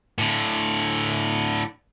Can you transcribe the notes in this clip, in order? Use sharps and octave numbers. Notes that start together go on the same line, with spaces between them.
A2 D3